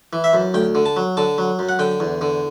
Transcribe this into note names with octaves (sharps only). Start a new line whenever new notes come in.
E3
E5
F#2
D2 G5
D3
A5
F#3
D3 A5
F#3
F#2
F#5
D3 G5
E2
D3